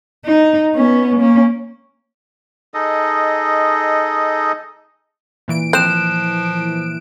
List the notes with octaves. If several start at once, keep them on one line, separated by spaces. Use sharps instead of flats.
D#4
B3 C#4
A#3 C#4
D#4 G#4 A4 D#5
A#2 E3 D7
F3 C4 F#6 E7